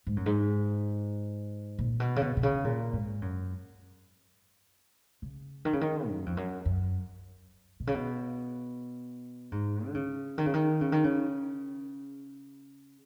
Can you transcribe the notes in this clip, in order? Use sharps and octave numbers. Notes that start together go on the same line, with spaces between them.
G#2
F#2
G#2
A#2
B2
C#3
B2
B2
C#3
A#2
G#2
F#2
C#3
D#3
C#3
D#3
F#2
F2
F#2
F#2
B2
C#3
B2
G#2
D#3
C#3
D#3
C#3
D#3
C#3
D#3
C#3